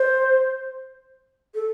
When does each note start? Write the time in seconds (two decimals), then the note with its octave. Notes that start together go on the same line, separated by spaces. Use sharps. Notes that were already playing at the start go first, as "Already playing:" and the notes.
Already playing: C5
1.55 A4